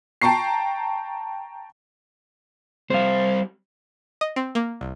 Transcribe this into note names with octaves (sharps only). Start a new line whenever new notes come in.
G5 A5 A#5 C#6 C7
G3 C4 C5 F5
D#5
C4
A#3
C2